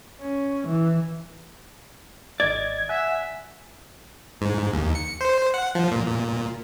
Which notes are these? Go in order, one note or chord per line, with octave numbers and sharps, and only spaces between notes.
C#4
E3
G#1 D5 D#5 G#6 A6
E5 F#5 G#5
G#2
D#2
C#7
C5
F#5
F3
A#2
A#2